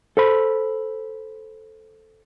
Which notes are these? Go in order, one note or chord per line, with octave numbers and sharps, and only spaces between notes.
A4 C5 B5